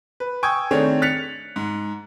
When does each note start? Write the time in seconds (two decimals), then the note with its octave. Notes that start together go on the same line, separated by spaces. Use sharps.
0.20 B4
0.43 G5 G#5 C#6 D#6 E6 G#6
0.71 D#3 A3 C4 D4 G#4 C#5
1.02 F#6 A6 B6 C#7 F7
1.56 G#2